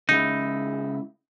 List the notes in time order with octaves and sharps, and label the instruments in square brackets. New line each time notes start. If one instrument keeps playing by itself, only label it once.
[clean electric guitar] C#3 G#3 E4 [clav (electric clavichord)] D#4